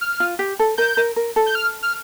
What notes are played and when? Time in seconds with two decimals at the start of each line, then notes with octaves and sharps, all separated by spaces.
0.01 F6
0.20 F4
0.39 G4
0.59 A4
0.78 A#4 G6
0.97 A#4
1.16 A#4
1.36 A4
1.46 G6
1.55 F6
1.82 F6